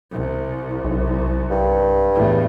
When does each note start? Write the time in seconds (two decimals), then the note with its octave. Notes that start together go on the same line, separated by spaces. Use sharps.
0.12 C2
0.85 B1
1.51 G2
2.14 E2 A2